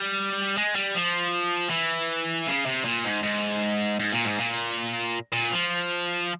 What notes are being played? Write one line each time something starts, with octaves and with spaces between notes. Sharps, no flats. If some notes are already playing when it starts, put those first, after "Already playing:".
Already playing: G3
G#3
G3
F3
E3
C#3
C3
A#2
G#2
G#2
G#2
A#2
G#2
A#2
A#2
F3